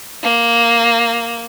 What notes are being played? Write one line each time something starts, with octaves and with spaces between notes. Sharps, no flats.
A#3